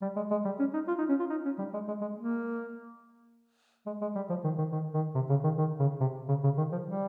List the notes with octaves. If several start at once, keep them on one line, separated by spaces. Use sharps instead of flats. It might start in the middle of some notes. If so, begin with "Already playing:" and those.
G3
G#3
G#3
G3
C#4
D#4
F4
D#4
C#4
F4
D#4
C#4
G3
G#3
G#3
G#3
A#3
G#3
G#3
G3
F3
D#3
D#3
D#3
D#3
C3
C#3
D#3
D#3
C#3
C3
C#3
C#3
D#3
F3
G3